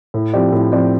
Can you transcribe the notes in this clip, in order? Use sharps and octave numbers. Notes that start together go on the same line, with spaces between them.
A2
F3 C4 G4 D5
A2
F3 C4 G4 D5